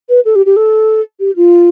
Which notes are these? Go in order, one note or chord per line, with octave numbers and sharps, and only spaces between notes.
B4
A4
G4
G4
A4
G4
F4